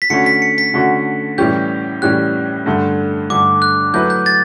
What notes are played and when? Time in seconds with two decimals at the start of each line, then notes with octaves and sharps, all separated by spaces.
0.02 B6
0.10 D3 A3 C#4 F#4 C#7
0.26 B6
0.42 C#7
0.58 B6
0.74 D3 A3 C#4 F#4
1.38 A2 E3 G3 C#4 G4 G6
2.02 A2 E3 G3 C#4 G4 F#6
2.66 G2 D3 A3
3.30 G2 D3 A3 D6
3.62 F#6
3.94 F#3 A3 E4 B4 G6
4.10 G6
4.26 A6